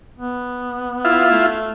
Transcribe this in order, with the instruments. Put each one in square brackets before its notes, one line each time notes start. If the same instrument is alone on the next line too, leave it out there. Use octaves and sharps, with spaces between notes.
[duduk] B3
[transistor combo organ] E4 F4
[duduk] A3